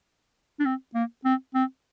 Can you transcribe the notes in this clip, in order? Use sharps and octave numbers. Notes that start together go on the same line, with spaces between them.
D4
C4
A#3
C4
C4